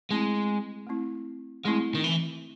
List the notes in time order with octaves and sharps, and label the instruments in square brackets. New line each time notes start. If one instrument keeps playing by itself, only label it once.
[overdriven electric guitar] G#3 [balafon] A3 C4 E4
[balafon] A3 C4 E4
[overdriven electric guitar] G#3 [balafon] A3 C4 E4
[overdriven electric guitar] D#3
E3